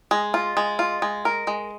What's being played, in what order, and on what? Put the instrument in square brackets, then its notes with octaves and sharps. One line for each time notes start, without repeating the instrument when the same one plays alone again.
[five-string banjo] G#3
F4
G#3
F4
G#3
A#4
G#3